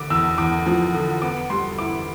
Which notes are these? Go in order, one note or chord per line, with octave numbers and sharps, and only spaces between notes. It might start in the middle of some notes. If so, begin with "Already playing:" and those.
Already playing: D3 D6
E2 E6
E2 D6
F3
D3
B3 D6
G3 C6
E4 D6